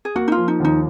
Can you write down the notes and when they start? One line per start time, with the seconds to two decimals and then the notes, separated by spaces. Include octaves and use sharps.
0.05 G#4
0.15 A#3 F#4
0.28 D#4
0.32 F4
0.37 F3
0.48 D#4
0.60 D#2 D#4